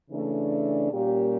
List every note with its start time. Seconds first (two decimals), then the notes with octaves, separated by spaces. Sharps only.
0.11 C#3 E3 A3 D4
0.92 A#2 G3 A#3 C#4 G4